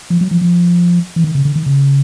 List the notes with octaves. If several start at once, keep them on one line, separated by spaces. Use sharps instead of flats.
F3
F#3
F3
F3
E3
D#3
C#3
D3
D#3
C#3